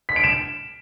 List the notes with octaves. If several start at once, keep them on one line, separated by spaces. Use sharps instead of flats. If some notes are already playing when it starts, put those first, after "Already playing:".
B6
D7
E7